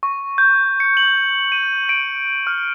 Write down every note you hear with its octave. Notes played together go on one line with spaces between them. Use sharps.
C#6
G6
C#7
F#7
D#7
D7
F6